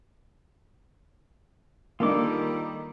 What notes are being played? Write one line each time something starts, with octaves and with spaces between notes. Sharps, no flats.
D#3 G3 A#3 D4 D#4 F4 A4 D6